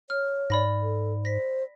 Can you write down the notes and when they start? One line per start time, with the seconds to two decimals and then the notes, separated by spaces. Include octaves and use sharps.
0.10 C#5 F6
0.50 G#2 D5 B5 A#6
0.82 A4
1.25 C5 A#6 B6